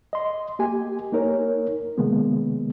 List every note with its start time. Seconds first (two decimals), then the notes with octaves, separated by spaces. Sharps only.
0.13 D#5 C6
0.59 A#3 G4 G#5
1.13 A#3 D#4 A#4 C#5
1.98 C3 D#3 G#3 A#3 B3